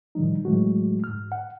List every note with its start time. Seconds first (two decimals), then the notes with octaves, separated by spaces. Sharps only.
0.15 A2 D#3 F3 G3 D#4
0.45 A2 E3 F#3 G#3 A3 F#4
1.04 G#2 F6
1.32 F#5